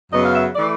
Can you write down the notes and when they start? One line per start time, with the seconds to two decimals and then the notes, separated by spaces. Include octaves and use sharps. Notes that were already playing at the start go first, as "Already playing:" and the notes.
0.11 F#2 C#3 F#3 B3 D#5
0.22 F5
0.33 E5
0.54 E3 A3 D5